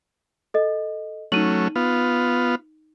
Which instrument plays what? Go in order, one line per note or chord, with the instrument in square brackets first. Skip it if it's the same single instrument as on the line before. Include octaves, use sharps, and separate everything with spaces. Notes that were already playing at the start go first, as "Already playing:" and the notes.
[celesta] A4 D#5
[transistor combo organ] F#3 A3 C#4 [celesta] D#4 D#7 F#7
[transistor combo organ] B3 F4